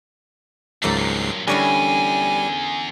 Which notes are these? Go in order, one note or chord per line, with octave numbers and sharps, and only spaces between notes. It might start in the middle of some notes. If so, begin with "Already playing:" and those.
C#2 G#2 F#3 A3 A#3 A4 A5 C7
G2 A#2
E2 D3 G3 C#4 E4 G#5